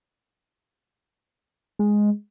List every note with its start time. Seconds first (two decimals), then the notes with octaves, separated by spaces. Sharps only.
1.79 G#3